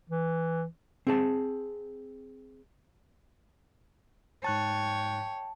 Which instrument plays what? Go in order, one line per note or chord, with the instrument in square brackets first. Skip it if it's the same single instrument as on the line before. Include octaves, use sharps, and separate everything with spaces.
[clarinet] E3
[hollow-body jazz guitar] C4 G#4 A5
[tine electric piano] G#2 F#6 A6 [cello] C#5 [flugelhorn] G5 [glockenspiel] A5